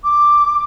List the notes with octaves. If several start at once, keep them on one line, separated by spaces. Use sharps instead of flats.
D6